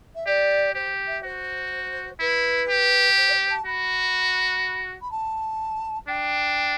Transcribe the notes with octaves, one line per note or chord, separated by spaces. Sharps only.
E5
G4 D5
G4 C5
E5
F#4 C5
E4 B4
G4
C5
D5
C5
A5
F#4 B5
B5
A5
D4 G5